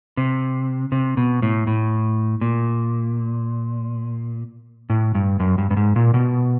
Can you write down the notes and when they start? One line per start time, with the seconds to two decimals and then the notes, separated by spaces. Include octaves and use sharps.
0.17 C3
0.92 C3
1.17 B2
1.42 A2
1.67 A2
2.41 A#2
4.90 A2
5.15 G2
5.40 F#2
5.58 G2
5.70 G2
5.77 G#2
5.96 A#2
6.14 B2